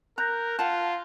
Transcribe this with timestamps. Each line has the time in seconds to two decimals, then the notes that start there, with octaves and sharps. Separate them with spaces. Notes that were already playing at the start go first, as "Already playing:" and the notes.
0.18 A#4 A#5 F#6 G6 A#6
0.59 F4 F#5 A5